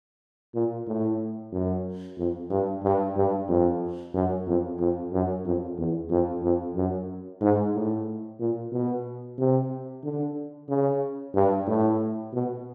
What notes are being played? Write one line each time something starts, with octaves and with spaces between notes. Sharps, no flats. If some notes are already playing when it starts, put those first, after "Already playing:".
A#2
A2
F#2
F2
G2
G2
G2
F2
F#2
F2
F2
F#2
F2
E2
F2
F2
F#2
G#2
A2
A#2
B2
C3
D3
C#3
G2
A2
B2